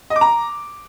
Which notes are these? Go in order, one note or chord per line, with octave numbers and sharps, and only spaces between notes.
D#5
D6
A#5